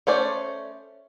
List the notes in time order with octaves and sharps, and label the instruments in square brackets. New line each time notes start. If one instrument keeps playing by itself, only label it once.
[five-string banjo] A3 C#4 C5 D5